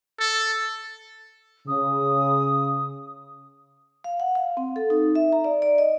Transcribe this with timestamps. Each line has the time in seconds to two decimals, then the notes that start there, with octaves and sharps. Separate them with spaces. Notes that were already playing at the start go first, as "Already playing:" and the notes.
0.20 A4
1.68 C#3 D#6
4.04 F5
4.20 F#5
4.35 F5
4.57 C4
4.76 A4
4.90 D#4
5.15 E5
5.32 A#5
5.44 D5
5.62 D5
5.78 D#5